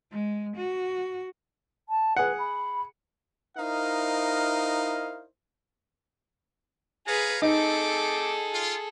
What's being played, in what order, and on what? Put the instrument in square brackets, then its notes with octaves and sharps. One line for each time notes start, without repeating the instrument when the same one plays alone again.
[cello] G#3
F#4
[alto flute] A5
[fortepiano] G#4 F#5 [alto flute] B4
[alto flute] B5
[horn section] D#4 E4 A#4 C5 D#5 F5
[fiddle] G#4 B4 [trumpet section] C#5 F5 A#5
[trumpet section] A3 C4 D6 [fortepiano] D#4 [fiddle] G#4 A4
[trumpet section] F4